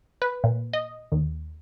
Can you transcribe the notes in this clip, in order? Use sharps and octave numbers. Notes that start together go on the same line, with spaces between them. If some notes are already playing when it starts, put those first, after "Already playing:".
B4
A#2
D#5
D#2